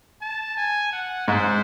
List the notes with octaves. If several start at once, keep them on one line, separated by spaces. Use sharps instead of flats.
A5
G#5
F#5
G#2 C5